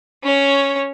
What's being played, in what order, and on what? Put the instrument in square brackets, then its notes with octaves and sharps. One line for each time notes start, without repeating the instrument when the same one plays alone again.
[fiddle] C#4 C#5